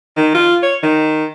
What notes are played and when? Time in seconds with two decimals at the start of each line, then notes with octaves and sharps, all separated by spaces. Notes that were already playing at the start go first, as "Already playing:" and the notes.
0.17 D#3
0.34 F4
0.63 C#5
0.83 D#3